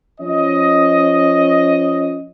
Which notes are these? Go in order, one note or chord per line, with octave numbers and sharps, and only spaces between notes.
F3 C#4 D#5